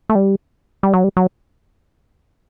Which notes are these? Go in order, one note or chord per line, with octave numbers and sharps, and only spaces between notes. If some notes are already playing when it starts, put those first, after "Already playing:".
A3
G3
G3
F#3
G3
F#3